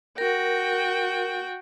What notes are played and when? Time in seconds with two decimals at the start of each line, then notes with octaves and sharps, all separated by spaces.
0.18 F#4 A#4 G5